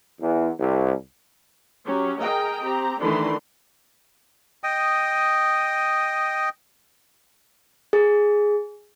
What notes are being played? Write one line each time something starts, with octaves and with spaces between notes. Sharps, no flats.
E2
C2
F#3 C#4 G4
G#4 A#4 D#5 G5 A#5
C4 G4 A#5
D#3 E3 A3 D4 C6
D#5 G5 D#6
G#4